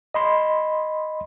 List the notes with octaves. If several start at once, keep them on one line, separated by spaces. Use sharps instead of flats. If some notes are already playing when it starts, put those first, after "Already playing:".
D#5 B5 C6